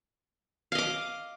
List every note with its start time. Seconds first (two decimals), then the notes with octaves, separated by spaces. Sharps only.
0.72 F5
0.75 D#5
0.78 D6